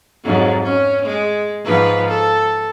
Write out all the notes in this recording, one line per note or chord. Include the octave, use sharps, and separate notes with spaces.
F2 G#2 F#3
C#4
G#3
G#2 F3 B4
A4